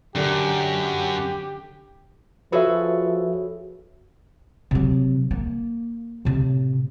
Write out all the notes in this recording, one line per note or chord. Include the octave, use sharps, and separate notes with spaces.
F#2 D3 G4
F3 F#4 G#4 A4 B4 C#5 E5
C3 F#3
A#3
A2 C3